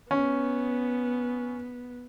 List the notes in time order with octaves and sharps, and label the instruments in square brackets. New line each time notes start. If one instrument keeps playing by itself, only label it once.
[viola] B3 [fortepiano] C#4